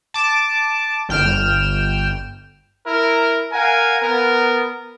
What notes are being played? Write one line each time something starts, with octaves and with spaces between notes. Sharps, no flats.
A5 D6
G1 G5 F6 E7
E4 A#4
A#4 F5 F#5 G#5
B3 A#4